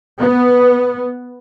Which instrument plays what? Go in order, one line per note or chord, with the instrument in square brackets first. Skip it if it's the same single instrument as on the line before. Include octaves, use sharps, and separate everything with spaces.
[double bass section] B3